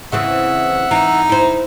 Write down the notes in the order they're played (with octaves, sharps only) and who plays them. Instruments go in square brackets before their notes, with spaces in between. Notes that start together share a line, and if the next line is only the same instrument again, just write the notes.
[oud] C#3 E3 C4 [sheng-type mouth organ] E5 F#5
[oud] E3 [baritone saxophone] D#4
[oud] E4 C5